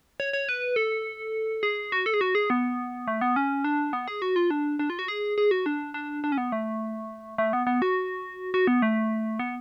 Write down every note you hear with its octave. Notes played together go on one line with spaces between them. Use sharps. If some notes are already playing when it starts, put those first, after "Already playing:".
C#5
C#5
B4
A4
G#4
F#4
A4
G#4
F#4
G#4
B3
A3
B3
C#4
D4
B3
G#4
F#4
F4
D4
D4
F4
F#4
G#4
G#4
F#4
D4
D4
D4
C#4
B3
A3
A3
B3
B3
F#4
F#4
B3
A3
B3